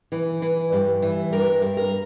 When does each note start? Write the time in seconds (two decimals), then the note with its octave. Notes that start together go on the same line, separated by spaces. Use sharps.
0.12 E3
0.42 E3
0.73 G2
1.02 E3
1.32 G2 A#4
1.62 G2
1.77 A#4